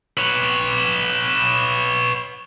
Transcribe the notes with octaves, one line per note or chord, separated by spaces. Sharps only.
B4 C#5